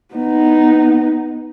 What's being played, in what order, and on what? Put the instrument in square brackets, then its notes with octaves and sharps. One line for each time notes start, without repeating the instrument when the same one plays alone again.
[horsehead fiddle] B3 D#4